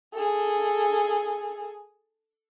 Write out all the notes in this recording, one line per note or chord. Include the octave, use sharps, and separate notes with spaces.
G#4 A4